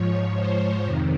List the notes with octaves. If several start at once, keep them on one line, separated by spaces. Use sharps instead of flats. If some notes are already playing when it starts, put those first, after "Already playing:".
Already playing: G#2 F3 C#5
C5
F2 C3 D#3